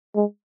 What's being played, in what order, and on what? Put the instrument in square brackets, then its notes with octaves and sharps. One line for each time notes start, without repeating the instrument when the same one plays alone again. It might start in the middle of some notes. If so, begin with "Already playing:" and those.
[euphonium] G#3